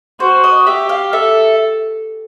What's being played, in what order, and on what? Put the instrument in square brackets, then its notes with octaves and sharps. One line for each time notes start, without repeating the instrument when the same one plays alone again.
[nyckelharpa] F#4 [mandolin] C5
[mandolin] D#5
[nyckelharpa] G4 [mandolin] E5
[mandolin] F5
[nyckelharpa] A4 [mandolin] E5